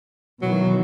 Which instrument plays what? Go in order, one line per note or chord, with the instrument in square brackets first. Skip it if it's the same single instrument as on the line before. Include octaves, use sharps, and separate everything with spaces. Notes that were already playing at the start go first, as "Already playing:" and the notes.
[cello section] B2 D#3 E3 [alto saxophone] F#3